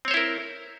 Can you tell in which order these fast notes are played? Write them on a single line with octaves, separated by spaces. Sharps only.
C4 C#5 C5 E4 A#4